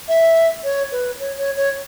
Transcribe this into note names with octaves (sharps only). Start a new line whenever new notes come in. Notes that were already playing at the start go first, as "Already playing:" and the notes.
E5
C#5
B4
C#5
C#5
C#5